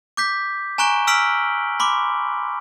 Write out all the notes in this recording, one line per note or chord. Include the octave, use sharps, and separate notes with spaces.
D6 G6 B6
G#5 A#5 C#6 F#6 D7 G7
E6 F6 B6 D7 F#7
B5 C6 D6